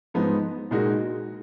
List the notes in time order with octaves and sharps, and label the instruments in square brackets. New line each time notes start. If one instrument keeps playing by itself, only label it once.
[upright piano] G#2 F3 B3 D#4
A#2 G#3 D#4 F#4